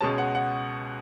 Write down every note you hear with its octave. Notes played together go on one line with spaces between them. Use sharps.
C#2 B2 G#3 C#4 A5
F#5
F#5